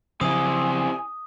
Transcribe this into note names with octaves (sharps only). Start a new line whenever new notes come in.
C#3 F3 F#3 C4 E4 G#5 D#6